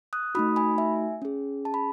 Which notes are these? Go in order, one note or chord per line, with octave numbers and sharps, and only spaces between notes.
D#6 F#6
A3 D#4 F#4 B5 D#6
G#5 B5
E5 G#5
C#4 G#4
A5
B5